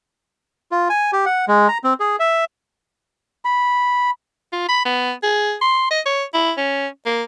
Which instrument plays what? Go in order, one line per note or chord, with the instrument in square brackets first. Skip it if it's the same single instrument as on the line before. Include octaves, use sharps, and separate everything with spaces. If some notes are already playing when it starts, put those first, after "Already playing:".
[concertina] F4
G#5
G4
F#5
G#3
A#5
C4
G#4
E5
[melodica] B5
[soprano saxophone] F4
B5
B3
G#4
C6
D#5
C#5
E4
C#4
A#3